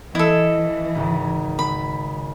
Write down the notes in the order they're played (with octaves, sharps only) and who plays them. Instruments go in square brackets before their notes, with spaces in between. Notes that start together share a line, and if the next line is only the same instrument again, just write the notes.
[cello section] E3 [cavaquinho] E4 A4 [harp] D#5
[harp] G#1 C#2
[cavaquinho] B5